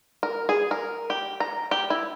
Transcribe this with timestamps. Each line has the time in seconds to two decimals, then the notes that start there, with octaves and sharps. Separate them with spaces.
0.23 A#4
0.49 G#4
0.71 A#4
1.10 G4
1.40 A#5
1.71 G4
1.90 E4